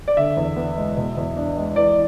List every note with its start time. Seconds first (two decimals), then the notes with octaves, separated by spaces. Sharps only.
0.08 D5
0.17 D3 E5
0.37 E2
0.56 B3
0.77 G#3
0.97 B2
1.17 E2
1.37 D4
1.57 G#3
1.76 E3 D5